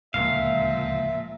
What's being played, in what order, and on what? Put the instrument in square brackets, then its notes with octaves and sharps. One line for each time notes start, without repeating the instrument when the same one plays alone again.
[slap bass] D1 C#2 [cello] A#2 F3 [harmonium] E5 [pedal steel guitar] F5